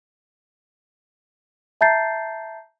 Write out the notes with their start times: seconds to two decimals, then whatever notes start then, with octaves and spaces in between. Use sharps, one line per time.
1.81 E5 A5 A#5 G6 A6 C7